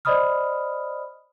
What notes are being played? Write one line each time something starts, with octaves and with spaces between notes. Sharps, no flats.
C5 D5 D#5 B5 D#6 F6